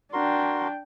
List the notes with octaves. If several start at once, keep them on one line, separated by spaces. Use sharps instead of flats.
D4 F#4 A#4 G5 C6